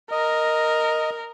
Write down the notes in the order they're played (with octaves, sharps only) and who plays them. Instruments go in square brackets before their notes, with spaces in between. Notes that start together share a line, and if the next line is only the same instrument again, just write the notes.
[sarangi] A#4 [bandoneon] D#5